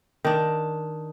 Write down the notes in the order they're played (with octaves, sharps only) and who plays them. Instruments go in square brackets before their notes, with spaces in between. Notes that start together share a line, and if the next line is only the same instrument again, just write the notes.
[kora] D#3 D4